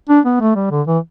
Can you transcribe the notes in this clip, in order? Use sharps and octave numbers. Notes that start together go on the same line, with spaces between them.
D4
B3
A3
G3
D3
E3